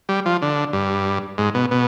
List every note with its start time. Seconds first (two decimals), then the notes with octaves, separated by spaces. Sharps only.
0.09 G3
0.26 F3
0.42 D3
0.73 G2
1.38 G#2
1.54 B2
1.71 B2